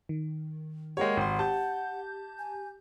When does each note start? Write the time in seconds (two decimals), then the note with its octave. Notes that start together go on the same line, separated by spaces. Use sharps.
0.09 D#3
0.97 G#3 A#3 G4 C#5 F#5 G5
1.17 G#1 C6
1.39 G4 A5 G6
2.39 G#5